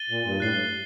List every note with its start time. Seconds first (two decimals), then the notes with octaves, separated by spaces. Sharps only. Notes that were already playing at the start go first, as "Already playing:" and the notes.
Already playing: A6 D#7 G7
0.09 A#2
0.24 G2
0.40 A2 F#6 A6 C7 G7
0.50 G2